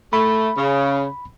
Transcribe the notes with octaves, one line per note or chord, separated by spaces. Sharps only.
A3 B5
C#3